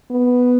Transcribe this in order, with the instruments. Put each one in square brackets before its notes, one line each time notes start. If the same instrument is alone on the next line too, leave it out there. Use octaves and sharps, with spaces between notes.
[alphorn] B3